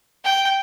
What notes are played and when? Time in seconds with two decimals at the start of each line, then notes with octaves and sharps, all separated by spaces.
0.24 G5